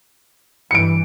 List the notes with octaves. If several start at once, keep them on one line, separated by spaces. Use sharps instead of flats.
G2 E3 C#7 D7